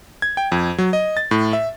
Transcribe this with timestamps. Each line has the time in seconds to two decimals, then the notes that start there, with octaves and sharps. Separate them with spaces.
0.22 G#6
0.37 G5
0.52 F2
0.78 F#3
0.93 D#5
1.17 A6
1.31 A2
1.53 E5